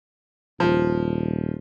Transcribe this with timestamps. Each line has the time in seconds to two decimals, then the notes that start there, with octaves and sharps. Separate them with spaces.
0.60 D#1 F3